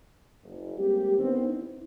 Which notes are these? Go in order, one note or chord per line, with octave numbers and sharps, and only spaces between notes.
F#1
G3 G#3 A#3 C4 G4
D#3 B3 C4 D4
E4